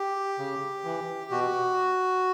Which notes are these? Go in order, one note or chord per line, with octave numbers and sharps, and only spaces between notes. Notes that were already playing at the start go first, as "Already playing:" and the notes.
Already playing: G4
C#3
E3
B2 F#4